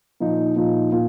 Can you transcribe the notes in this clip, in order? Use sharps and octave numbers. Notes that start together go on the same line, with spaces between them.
A#2 F3 D#4
A#2 F3 D#4
A#2